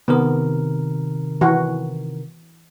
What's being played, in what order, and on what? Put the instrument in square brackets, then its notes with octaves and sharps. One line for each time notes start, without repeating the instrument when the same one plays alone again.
[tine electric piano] C3 D#3 A#4 [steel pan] B3
[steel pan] E3 F#4